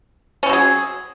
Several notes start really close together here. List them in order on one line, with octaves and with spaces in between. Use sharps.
C#4 C4 F#3 G#4